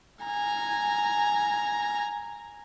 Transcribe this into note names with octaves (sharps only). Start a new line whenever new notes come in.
G#5 A#5